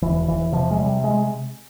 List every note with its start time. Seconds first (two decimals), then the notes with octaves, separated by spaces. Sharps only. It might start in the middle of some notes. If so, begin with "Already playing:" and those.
0.02 E1 E3
0.28 E1 E3
0.52 C3 F3
0.71 G#3
0.78 C3 G3
1.04 G#3